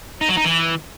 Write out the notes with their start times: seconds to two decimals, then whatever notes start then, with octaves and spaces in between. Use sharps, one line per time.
0.21 D#4
0.29 F#3
0.37 D#4
0.45 E3